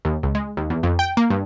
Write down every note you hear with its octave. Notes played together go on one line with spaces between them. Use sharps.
D#2
C#2
G#3
D#2
E2
F2
G5
A#3
G2